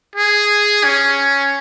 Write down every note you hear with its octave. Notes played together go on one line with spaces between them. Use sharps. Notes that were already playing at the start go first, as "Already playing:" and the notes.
G#4
C#4